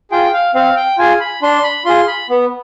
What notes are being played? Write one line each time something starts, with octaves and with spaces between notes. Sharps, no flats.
F4 G#4 G5
F5
C4 F5
G5
F4 G#4 G#5
B5
D4 C6
B5
F4 G#4 C6
B5
B3